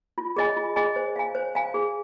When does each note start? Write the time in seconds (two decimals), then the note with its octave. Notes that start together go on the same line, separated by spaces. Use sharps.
0.18 F4
0.36 G#4 D#5 G#5
0.56 F4
0.76 G#4 D#5 G#5
0.96 C5
1.16 F5 G#5
1.35 C5
1.55 F5 G#5
1.74 G#4